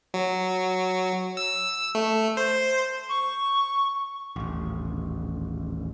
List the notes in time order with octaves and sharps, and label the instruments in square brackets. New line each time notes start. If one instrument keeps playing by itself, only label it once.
[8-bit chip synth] F#3
E6
A3
C5
[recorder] C#6
[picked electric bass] D#1 A1